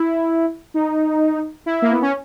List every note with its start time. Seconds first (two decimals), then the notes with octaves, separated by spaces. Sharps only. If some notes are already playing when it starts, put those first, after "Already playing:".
Already playing: E4
0.74 D#4
1.66 E4
1.82 A#3
1.92 B3
2.02 C#4